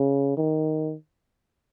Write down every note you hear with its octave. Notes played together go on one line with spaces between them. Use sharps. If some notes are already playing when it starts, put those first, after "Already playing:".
Already playing: C#3
D#3